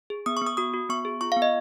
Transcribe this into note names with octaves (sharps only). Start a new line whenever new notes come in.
G#4
B3 D#6
C#6
B3 D#6
F#4 D#6
F#4
B3 C#6
G#4
F4 C#6
F5
B3
D#5